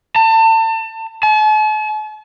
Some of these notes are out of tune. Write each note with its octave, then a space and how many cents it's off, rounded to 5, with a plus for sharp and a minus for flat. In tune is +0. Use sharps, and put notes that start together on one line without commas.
A5 +30
A5 -45